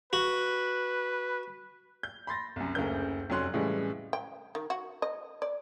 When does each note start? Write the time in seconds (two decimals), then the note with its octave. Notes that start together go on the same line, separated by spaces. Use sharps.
0.13 F#4 B4
2.03 G6
2.27 B5 C6 A6 A#6
2.56 C2 F#2
2.75 F#1 D2 C#3 A#4 G6
3.30 F1 F#3 C#4 C6 F#6
3.54 A2 C#3 E3 G3 G#3
4.13 G5
4.55 D#3
4.70 F#4
5.02 D#5
5.42 D5